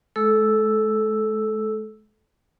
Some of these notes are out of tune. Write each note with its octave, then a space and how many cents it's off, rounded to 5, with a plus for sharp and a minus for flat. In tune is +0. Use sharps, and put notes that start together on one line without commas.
G#3 +45 A4 -15 E6 +0